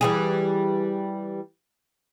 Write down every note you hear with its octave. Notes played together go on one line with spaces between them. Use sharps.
E3 G3 G#4